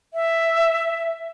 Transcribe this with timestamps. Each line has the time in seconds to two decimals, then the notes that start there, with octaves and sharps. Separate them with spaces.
0.14 E5